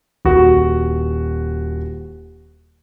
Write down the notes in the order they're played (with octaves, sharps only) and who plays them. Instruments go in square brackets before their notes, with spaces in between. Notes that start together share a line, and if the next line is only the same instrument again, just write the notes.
[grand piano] D#1 F#4